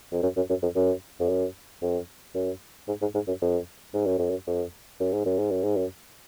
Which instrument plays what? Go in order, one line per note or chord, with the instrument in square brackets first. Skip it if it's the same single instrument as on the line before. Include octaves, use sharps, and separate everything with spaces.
[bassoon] F2
F#2
F#2
F#2
F2
F#2
F2
F#2
F2
F#2
G#2
G#2
G#2
F#2
F2
G#2
F#2
F2
F#2
F2
F#2
G#2
F#2
G#2
F#2
G#2
F#2